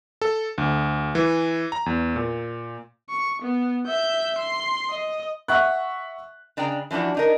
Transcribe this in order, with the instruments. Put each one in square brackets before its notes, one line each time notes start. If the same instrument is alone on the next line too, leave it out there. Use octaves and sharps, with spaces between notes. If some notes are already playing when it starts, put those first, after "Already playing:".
[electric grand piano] A4
D2
E3
A#5
E2
A#2
[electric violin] C#6
B3
E5 G6
C6
D#5
[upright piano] E5 F#5 C#6 F#6
[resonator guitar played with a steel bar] C#3 D4 G#4 G5 A#5
E3 F3 D4 E4 F#4
D4 D#4 A#4